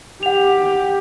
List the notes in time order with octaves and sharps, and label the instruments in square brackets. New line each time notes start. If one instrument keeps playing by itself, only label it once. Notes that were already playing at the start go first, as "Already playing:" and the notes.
[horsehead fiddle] G4 [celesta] F#5 F7